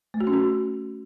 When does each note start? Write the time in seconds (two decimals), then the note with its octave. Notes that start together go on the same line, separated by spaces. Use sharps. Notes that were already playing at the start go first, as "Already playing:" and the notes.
0.14 A3
0.21 F#4
0.27 C#4
0.34 F#4